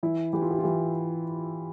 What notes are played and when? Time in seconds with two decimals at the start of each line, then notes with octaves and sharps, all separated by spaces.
0.03 E3 E4
0.33 E3 G4
0.42 F4
0.50 G4
0.59 F4
0.64 E3 G4